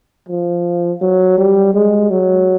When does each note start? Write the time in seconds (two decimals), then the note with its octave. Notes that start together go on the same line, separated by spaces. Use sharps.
0.29 F3
1.01 F#3
1.38 G3
1.74 G#3
2.10 F#3